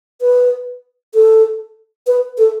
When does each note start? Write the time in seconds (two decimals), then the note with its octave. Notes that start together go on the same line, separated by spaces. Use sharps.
0.21 B4
1.14 A4
2.07 B4
2.38 A4